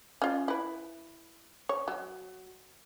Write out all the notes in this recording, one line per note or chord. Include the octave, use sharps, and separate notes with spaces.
C#4 F4
E4 B4
C#5
F#3